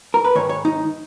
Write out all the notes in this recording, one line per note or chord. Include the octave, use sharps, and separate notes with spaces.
A#4
B4
G#2 D#3 C#5
C#5
D#4